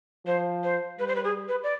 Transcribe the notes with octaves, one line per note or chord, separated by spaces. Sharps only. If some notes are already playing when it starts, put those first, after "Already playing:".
F3 C5
C5
G3 B4
C5
B4
G#4
B4
D5